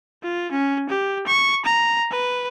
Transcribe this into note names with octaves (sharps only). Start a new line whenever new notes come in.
F4
C#4
G4
C#6
A#5
B4